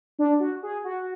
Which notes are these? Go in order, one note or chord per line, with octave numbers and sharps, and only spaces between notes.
D4
F#4
G#4
F#4